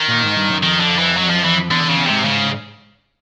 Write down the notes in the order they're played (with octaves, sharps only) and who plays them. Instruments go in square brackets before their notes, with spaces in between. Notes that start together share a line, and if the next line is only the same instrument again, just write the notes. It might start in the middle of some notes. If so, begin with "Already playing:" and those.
Already playing: [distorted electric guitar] D#3
[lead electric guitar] A#2
G#2
G2
F#2
[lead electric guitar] F2 [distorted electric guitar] D#3
[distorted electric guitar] D3
E3
F#3
F3
E3
[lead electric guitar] E2 [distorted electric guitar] D3
[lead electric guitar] E2
[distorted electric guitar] C#3
[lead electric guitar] E2
[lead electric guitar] G#2 [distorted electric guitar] C3
[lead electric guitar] G#2 [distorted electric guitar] C#3